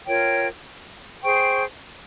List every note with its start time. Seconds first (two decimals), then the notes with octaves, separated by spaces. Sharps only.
0.07 F4 A#4 C#5 G5
1.23 G#4 C5 G5 C#6